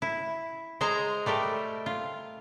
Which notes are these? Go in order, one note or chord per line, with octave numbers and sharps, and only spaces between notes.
E4
G#3 C5 D#5 G#5 A#5
G3 A3 A#4 G5
F4